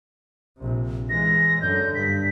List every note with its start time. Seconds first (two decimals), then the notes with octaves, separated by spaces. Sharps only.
0.58 A#1 C3
1.10 E3 G#3 A#6
1.62 F#2 D3 G6
1.95 G2 B6